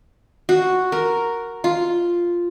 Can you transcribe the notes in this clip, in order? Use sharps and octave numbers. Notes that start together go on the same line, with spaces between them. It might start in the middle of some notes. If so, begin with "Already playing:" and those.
F#4
A#4
F4